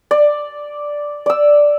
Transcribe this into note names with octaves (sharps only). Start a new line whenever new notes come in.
D5
D5 E6